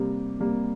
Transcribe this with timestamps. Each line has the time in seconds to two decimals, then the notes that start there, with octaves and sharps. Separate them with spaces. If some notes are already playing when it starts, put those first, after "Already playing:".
Already playing: C3 G3 A#3
0.40 C3 G3 A#3